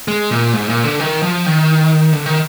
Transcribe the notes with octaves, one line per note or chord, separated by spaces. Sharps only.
G#3
A#2
G#2
A#2
D3
D#3
F3
D#3
D3
D#3